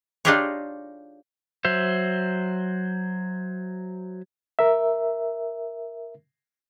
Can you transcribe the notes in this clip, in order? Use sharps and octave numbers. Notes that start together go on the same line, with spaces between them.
D4 D#4 F4 G4 G#4 C#5
F#3 C5 E5
A#4 E5